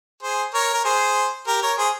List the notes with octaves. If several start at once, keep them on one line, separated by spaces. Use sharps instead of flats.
G#4 C5
A#4 C#5
A#4
G#4 C5
G4 A#4
A#4 C#5
G#4 C5